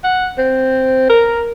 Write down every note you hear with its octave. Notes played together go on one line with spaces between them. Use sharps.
F#5
C4
A#4